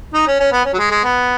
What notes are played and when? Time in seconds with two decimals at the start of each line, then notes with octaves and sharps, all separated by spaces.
0.14 D#4
0.27 C#4
0.40 C#4
0.52 B3
0.65 C#4
0.73 F#3
0.79 G#3
0.91 G#3
1.04 B3